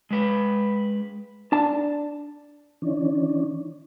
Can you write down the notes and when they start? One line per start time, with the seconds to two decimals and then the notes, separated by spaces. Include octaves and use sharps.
0.11 G#3 B4
1.52 D4 A5
2.82 D#3 E3 C#4 D4